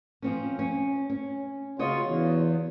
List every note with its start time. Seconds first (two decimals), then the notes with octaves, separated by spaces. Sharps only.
0.22 F3 C4 C#4
0.59 C#4
1.10 C#4
1.79 C#3 F4 F#4 C#5 D#5
2.02 E2